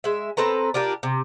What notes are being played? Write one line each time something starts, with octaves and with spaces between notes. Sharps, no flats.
G#3 E5
C4 A4 B4 A#5
D4 F4 G4 A#4
C3